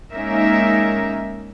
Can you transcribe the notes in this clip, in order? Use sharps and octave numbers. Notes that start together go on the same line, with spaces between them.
G#3 A#3 C#4 D#4 A#4 E5